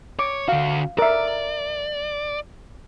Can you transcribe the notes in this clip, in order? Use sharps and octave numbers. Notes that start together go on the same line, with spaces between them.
C#5 D6
D3 F#4 F5
A#4 D5 E5